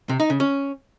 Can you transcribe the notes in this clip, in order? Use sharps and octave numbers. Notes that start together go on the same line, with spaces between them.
C3
D#4
C#3
C#4